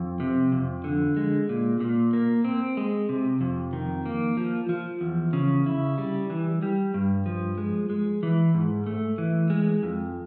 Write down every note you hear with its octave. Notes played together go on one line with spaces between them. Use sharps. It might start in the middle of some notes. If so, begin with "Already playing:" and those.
Already playing: F2
C3
F2
D3
G#3
A#2
A#2
A#3
C4
G#3
C3
F2
D#3
A#3
F3
F3
E2
C#3
E4
G3
E3
G3
G2
F3
G#3
G#3
E3
G#2
A3
E3
G#3
F2